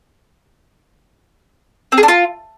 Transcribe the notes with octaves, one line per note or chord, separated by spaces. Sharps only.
C4
G#4
D4
F4